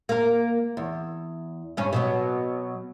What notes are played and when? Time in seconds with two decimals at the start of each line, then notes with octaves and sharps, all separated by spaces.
0.09 A#3 A#4
0.77 E2
1.77 G2 C#4
1.93 B2 F#3 B3